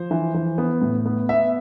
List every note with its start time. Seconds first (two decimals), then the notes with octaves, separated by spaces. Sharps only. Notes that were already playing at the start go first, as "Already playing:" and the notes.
Already playing: F3 C5
0.11 E3
0.34 E3
0.58 B3
0.82 A2
1.06 B3
1.29 B3 E5